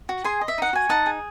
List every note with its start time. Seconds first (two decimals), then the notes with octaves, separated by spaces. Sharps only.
0.09 F#4
0.24 G#4 G#5 C6
0.41 D#5
0.48 E5
0.58 D#4 F#5
0.73 F#4 G#5
0.89 D#4 F#5 A5
1.06 G#4